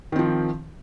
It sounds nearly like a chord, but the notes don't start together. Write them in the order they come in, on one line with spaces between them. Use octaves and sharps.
D#3 C4 F3